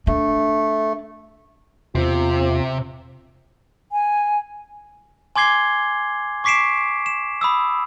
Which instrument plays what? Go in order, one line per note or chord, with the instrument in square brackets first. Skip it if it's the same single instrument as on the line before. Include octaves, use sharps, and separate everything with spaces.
[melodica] A3 [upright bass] D4
[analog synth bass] E2 [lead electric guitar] C3 [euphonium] F4
[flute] G#5
[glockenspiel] G#5 C6 D6 G#6 C7 G7
C#6 D6 B6 C7 D7 E7
E7
B5 D#6 E6